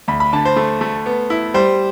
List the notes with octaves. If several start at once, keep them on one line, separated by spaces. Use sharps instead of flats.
D2 B5
B5
D3 A5
C5
A3
A3
B3
E4
G3 C5